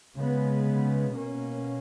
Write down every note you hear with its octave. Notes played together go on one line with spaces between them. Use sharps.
C#3 G#3 B3
B2 A#3 C#4